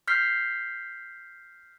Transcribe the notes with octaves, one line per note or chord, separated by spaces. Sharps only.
F6 G6 B6 C7